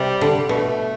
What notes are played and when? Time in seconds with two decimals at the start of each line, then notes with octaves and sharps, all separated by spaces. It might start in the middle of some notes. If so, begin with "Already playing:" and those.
Already playing: C3 G3
0.21 D3
0.49 B2 A3